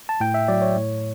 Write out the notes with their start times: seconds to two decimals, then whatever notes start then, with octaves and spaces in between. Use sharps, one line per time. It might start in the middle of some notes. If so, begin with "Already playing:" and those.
0.09 A5
0.20 A2 G5
0.34 E5
0.48 F#3 D5
0.62 C#5
0.75 A2